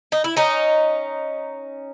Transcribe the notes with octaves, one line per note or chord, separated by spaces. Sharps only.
D#4
E4
C#4 D#4